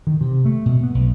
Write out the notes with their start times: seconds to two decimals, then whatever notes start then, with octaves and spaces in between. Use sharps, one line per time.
0.07 D#3
0.21 C3
0.45 A3
0.66 B2
0.83 B3
0.95 B1